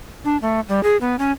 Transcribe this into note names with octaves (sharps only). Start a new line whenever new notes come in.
D4
A3
G3
G#4
B3
C#4